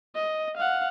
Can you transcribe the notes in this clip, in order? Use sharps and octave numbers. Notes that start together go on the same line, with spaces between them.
D#5
F5 F#5